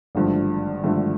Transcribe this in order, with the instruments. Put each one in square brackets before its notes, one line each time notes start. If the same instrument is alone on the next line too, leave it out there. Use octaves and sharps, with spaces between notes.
[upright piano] G#1 G2 D3 F3 A3
G#1 G2 D3 F3 A3